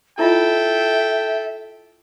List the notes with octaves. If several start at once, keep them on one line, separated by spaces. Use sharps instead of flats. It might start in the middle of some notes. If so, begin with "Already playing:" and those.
E4 F4 A4 D#5 E5 G5